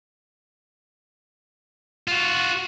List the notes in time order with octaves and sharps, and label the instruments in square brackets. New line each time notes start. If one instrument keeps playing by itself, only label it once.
[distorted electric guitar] F4 F#4